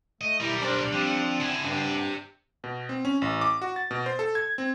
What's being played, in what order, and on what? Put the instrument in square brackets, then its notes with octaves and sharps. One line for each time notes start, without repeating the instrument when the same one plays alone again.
[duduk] A3 [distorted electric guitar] D#5
[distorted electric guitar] B1 A#4 [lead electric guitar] G3 [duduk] E4
[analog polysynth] D4 [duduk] C5
[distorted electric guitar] F3 [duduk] C4
[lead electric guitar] E4 G#4 [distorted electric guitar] F#5 A5
[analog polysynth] G2 [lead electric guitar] C3 C4 [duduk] D4
[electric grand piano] B2
C4
C#4
A1
D6
F#4
A6
B2
C5
A4
G#6
C4